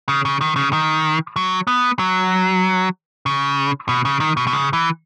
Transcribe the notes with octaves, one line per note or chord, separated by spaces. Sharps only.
C#3
C#3
D#3
C#3
D#3
F#3
B3
F#3
C#3
B2
C#3
D#3
B2
B2
C#3
E3